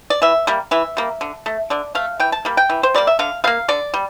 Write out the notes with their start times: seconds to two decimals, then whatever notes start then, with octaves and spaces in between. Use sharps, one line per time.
0.10 D5
0.22 E3 E5
0.47 G3 A#3
0.71 E3 E5
0.97 G3 A#3
1.21 D3
1.46 A3
1.70 D3 D5
1.95 A3 F5
2.20 E3 G5
2.32 A5
2.45 G3 A#3
2.57 G5
2.70 E3
2.83 C5
2.94 G3 A#3 D5
3.07 E5
3.19 D3 F5
3.44 G3 A#3 F5
3.68 D3 D5
3.94 G3